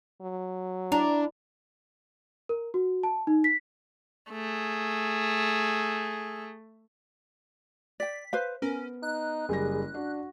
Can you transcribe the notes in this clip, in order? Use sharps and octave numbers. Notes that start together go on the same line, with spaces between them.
F#3
D4 E4 A#4 D5
A#4
F#4
A5
D#4
B6
A3 G#4
D5 G5 B6
B4 C5 F5
B3 C#4 A#4
D#4 F#6
F#1 G3 G#4 A#6
D4 F#4